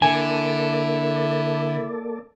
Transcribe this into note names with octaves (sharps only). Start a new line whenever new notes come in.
D3 A#3 E4 A4 D5 G#5